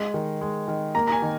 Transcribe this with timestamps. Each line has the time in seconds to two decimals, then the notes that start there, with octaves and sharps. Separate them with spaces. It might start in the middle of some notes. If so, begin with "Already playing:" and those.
Already playing: G#3
0.14 D#3
0.41 G#3
0.68 D#3
0.95 A#3 A#5
1.07 A#5
1.12 G#5
1.22 D#3